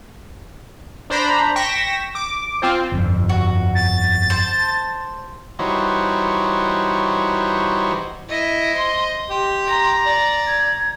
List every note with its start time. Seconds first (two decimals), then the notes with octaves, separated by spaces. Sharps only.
1.10 D4 C5 A#5 B5
1.56 G5 C#6 A#6 B6 E7
2.15 D6
2.62 C4 F4 C5
2.92 G1 F2
3.29 F#4
3.75 A6
4.30 C5 A5
5.59 E3 G3 D#4 F#4 C5 C#5
8.28 E4 D#5
8.74 C5 C6
9.30 G4 C6
9.67 A#5
10.06 D5
10.47 G#6